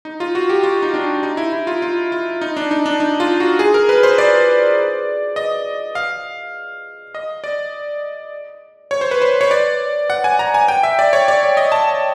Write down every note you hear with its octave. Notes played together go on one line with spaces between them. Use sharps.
D#4
F4
F#4
G4
F4
D#4
D4
D#4
E4
E4
F4
F4
F4
D#4
D4
D#4
D4
D#4
F4
F#4
G#4
A#4
B4
C5
D5
D#5
F5
D#5
D5
C#5
C5
B4
C5
C#5
D5
F#5
G#5
A#5
G#5
G5
E5
D5
C#5
D5
D5
D#5
A5